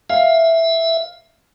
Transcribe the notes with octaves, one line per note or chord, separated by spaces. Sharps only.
E5 F5